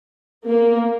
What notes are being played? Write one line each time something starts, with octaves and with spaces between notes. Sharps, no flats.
A#3